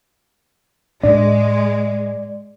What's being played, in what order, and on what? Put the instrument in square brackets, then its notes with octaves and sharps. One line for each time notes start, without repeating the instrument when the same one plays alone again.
[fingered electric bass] A2 D4 [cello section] G#3 [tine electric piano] D5